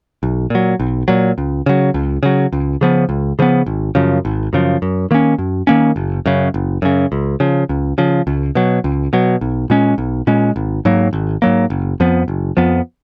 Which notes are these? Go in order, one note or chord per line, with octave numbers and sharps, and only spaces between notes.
B1
A#2 F#3
B1
A#2 F#3
C#2
C#3 F#3
C#2
C#3 F#3
C#2
C#3 F3 B3
C#2
C#3 F3 B3
G#1
F#2 C#3 F3
G#1
F#2 C#3 F3
F#2
D#3 A#3 C#4
F#2
D#3 A#3 C#4
F#1
F#2 C#3
F#1
F#2 C#3
C#2
C#3 F3
C#2
C#3 F3
C#2
B2 F#3
C#2
B2 F#3
B1
A#2 G#3 C#4
B1
A#2 G#3 C#4
G#1
G#2 F#3 A#3
G#1
G#2 F#3 A#3
F#1
F2 F3 B3
F#1
F2 F3 B3